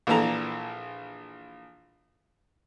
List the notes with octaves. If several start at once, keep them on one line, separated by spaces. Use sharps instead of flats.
A#1 A#2 E3 A4 A#5